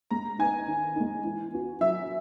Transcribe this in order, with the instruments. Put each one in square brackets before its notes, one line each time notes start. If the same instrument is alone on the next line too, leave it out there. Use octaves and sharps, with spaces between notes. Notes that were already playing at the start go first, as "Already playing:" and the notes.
[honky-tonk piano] G#3 [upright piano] A#5
[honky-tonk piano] B3 D#4 [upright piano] G#5
[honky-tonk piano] D#3
G#3 D#4
E3
B3 F#4
[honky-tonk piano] F#3 [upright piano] E5